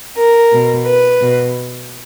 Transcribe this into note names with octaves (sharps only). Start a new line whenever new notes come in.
A#4
B2
B4
B2